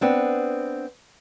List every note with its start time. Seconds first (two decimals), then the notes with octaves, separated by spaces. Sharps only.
0.01 B3 C4 D4